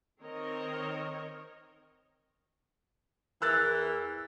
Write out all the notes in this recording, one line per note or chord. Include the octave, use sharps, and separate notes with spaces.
D#3 C4 A#4 C#5 D#5
E2 E3 A#4 E6 F#6 A6